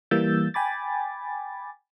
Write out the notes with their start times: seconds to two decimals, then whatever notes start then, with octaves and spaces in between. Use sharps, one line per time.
0.11 E3 G3 A#3 E6 G6 A6
0.54 G5 G#5 B5 D6 A6